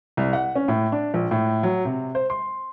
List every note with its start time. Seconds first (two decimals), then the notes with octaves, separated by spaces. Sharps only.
0.17 C2
0.33 F#5
0.56 C#4
0.68 A2
0.92 D4
1.14 A#1
1.31 A2
1.63 F#3
1.85 C3
2.15 C5
2.30 C6